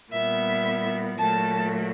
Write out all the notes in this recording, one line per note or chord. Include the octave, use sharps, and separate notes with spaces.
A#2 G3 B3 E5
A#2 F#3 A3 A5